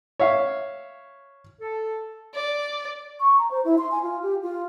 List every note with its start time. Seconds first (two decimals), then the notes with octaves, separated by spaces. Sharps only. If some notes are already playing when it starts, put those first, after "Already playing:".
0.20 C#5 E5 F5
1.60 A4
2.34 D5
3.20 C#6
3.38 A#5
3.51 C5
3.65 E4
3.78 C6
3.91 G#5
4.03 F4
4.23 G4
4.43 F4